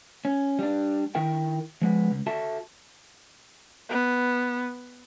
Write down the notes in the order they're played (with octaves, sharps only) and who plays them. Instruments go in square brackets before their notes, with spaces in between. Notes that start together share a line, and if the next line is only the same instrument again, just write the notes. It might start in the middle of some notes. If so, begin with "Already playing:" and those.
[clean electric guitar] C#4
G3 D4
D#3 E4 A#4 G5
F3 G#3 B3
C#2
F#4 A4 E5 A5
[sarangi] B3